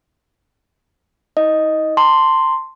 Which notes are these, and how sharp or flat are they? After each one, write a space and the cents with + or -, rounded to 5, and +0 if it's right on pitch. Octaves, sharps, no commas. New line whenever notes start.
D#4 +45 D#5 +0
A5 +35 C6 +0